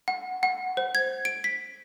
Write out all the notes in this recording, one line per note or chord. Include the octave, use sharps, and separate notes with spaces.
F#5
F#5
C5
G#6
D7
B6